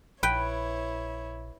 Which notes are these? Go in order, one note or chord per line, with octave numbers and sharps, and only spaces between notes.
A#1 E4 B4 C#5 G5